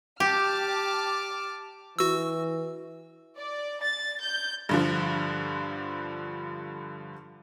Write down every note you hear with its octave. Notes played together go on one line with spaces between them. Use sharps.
G4 A5 D6 F6
E3 F#4 E6
D5
A6
G6
G2 D3 F3